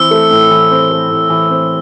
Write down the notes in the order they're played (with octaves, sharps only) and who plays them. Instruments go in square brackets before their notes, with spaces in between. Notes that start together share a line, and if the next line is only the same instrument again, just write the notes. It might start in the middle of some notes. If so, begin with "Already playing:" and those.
Already playing: [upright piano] E3 C4 [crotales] E6
[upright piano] A3
A2
E3
C4
A3
A2
E3
C4